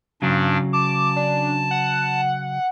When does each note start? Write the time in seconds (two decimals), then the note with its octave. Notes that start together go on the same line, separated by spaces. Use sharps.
0.22 G2 C#3 F#3 D4
0.73 A5 D6
1.16 D4
1.71 F#5